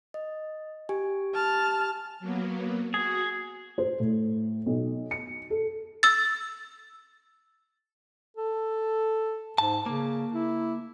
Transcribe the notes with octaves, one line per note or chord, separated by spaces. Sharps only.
D#5
G4 G#5
A5 F6
F#3 A#3 B3
F#4 G#4
C5
A2
B1
C#7
A4
E6 A6
A4
G#2 A5
C#3 A#3
E4